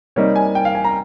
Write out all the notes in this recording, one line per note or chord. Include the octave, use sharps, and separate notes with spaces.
C3 G3 A#3 D#4 C#5
G#5
G5
F5
G#5
A#5